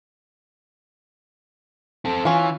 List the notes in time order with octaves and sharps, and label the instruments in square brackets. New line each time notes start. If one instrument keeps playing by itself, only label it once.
[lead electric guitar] C4 A4
[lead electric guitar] E3 [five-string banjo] C#4 F4